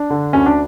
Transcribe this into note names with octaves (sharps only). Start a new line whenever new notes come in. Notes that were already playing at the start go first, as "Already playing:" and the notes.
Already playing: D4
D3
D2 C#4
D4